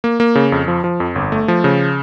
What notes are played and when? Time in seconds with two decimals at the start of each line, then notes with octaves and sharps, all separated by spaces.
0.04 A#3
0.20 A#3
0.35 C#3
0.52 F2
0.68 F3
0.84 F3
1.00 F2
1.15 G1
1.32 A3
1.48 F3
1.64 C#3